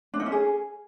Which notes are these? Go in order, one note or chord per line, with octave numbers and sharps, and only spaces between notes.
D4
D#4
C#4
G#4